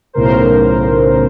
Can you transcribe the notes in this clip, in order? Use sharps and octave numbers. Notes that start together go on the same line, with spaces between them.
B1 A2 C#3 A#4 C5